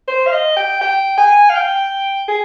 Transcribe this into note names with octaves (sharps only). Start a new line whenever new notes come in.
C5
F5
D#5
G5
G5
G#5
F5
G5
G#4